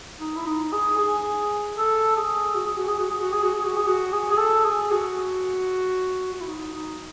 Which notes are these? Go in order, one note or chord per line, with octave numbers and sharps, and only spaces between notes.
D#4
E4
D#4
G#4
G#4
A4
G#4
F#4
G#4
F#4
G#4
F#4
G#4
F#4
G#4
F#4
G#4
F#4
G#4
F#4
G#4
G#4
A4
G#4
F#4
F#4
E4
D#4
D#4